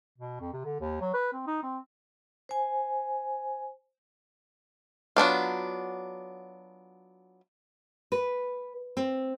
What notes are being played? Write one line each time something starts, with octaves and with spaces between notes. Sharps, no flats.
B2
F2
C3
D3
D#2
F#3
B4
C4
D#4
C4
C5 G#5
F#3 B3 D4 F4
B4
C4